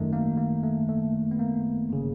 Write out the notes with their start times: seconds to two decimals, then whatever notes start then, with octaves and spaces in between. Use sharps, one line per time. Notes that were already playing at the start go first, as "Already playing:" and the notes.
Already playing: G#1 F#2 D#3 A3
0.13 A#3
0.38 A#3
0.63 A3
0.89 A3
1.31 B3
1.39 A#3
1.89 G1 C#3